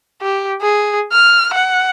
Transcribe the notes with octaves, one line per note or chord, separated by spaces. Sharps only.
G4
G#4
F6
F#5